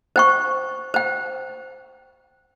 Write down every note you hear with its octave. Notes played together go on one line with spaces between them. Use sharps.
C5 G5 C#6
C5 G5